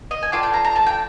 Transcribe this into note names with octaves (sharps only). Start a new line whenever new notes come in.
D#5
G#5
D4 F4 A4 G5
G5
A#5
A#5
A5
G5